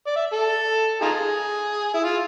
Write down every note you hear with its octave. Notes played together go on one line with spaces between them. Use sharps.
D5
E5
A4
D#4 F4 G#4
E4
F4